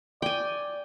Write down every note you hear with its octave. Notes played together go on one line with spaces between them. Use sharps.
D5 G5 G#5